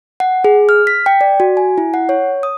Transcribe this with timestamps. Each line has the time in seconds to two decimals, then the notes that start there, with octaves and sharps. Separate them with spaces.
0.20 F#5
0.44 G#4
0.69 F6
0.87 B6
1.06 G5
1.21 D5
1.40 F#4
1.57 G#5
1.78 E4
1.94 F#5
2.09 C#5
2.43 D#6